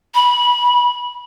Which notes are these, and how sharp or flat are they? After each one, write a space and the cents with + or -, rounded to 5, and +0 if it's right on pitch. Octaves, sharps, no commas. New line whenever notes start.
B5 -20